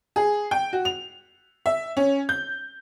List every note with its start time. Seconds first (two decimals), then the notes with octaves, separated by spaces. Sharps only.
0.16 G#4
0.51 G5
0.73 F#4
0.85 F7
1.66 E5
1.97 C#4
2.29 G6